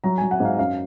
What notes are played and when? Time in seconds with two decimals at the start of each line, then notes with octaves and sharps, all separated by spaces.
0.04 F#3 A#5
0.18 F#3 G#5
0.31 F#5
0.40 G#2 F5
0.59 F#2 F5